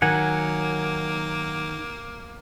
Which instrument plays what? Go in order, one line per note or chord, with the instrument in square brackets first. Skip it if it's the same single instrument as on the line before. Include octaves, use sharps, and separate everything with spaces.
[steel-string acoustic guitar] D#3 [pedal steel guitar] F#3 F#5 G#5 [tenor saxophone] A#3